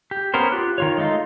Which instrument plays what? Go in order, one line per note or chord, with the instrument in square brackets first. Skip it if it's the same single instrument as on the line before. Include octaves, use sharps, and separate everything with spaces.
[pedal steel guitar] G4
B3 C#4 A#4 C5
F4 G4 F#6
D#3 F4 C#5
G#3 A3 D#4 F4